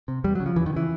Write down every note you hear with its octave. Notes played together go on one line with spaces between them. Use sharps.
C3
E2 G3
C#3 F#3
F3
E2 E3
D#3
C#3 E3